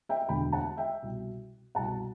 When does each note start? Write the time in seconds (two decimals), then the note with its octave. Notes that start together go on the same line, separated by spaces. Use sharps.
0.09 E5 G5
0.29 E1 D2 D3 G5 B5
0.52 F#5 A5
0.77 E5 G5
1.02 C2 B2
1.75 C2 B2 F#5 A5